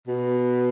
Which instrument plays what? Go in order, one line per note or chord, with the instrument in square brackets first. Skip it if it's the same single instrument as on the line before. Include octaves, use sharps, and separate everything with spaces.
[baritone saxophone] B2